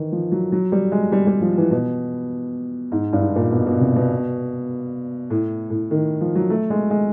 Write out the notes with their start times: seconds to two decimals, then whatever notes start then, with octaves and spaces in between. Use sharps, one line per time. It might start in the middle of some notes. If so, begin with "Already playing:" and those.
Already playing: D#3 E3
0.12 F3
0.32 F#3
0.52 F#3
0.72 G3
0.92 G#3
1.12 G3
1.27 G3
1.41 F3
1.57 E3
1.71 B2
2.92 G#2
3.13 G2
3.21 G#2
3.36 A#2
3.51 B2
3.67 B2
3.81 C3
3.96 B2
5.30 A2
5.70 A2
5.91 D#3
6.21 F3
6.35 F#3
6.50 A3
6.70 G#3
6.90 G#3